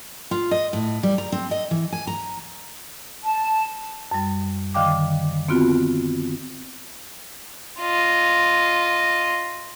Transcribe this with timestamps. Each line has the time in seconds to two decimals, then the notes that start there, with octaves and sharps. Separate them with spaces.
0.31 F4
0.51 D#5
0.73 A2
1.03 G3
1.18 A#5
1.32 C4
1.51 D#5
1.71 E3
1.92 G#5
2.07 A#5
3.24 A5
4.11 F#2 G3
4.74 D3 D#3 F5 G5 D6
5.48 B3 C4 F4 F#4
7.80 F4 D#5